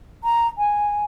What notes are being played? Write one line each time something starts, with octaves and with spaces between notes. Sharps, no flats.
A#5
G#5